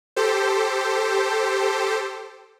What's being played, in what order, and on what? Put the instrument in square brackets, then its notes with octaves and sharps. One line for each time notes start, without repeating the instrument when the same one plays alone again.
[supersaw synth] G4 A4 C5